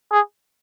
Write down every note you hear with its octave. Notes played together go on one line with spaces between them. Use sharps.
G#4